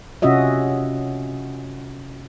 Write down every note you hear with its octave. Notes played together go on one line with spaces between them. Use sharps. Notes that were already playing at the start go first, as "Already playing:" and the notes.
C3 C#4 F4 F#4 D#5 E5